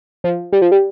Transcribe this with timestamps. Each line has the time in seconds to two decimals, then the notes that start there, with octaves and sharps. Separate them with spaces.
0.24 F3
0.52 G3
0.62 F3
0.72 G3